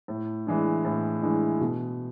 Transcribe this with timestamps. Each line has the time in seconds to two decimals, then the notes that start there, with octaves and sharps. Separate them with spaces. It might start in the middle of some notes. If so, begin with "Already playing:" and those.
0.08 A2
0.47 E3 G#3 D4
0.85 A2
1.22 E3 G#3 D4
1.61 B2